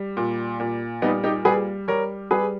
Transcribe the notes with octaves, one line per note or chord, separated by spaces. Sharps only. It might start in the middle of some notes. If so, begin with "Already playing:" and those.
Already playing: G3
A#2
A#2
G3 B3 D#4
D#4 G4
G3 G#4 B4
G3 A#4 C#5
G3 G#4 B4